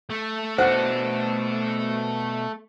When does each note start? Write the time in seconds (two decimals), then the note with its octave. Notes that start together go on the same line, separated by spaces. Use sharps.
0.10 A3
0.58 B2 D4 F#4 C5 F#5